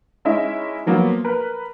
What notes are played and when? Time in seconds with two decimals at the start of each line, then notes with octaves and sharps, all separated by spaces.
0.25 G#3 C#4 D#4 E4 D#5 E5
0.86 F3 F#3 A#3 B3
1.25 A#4 B4